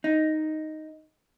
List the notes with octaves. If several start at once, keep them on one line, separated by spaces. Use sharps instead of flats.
D#4